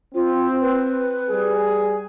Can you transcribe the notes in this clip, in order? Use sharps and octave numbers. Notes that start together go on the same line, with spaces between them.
C4 F4
B4
G3 G#4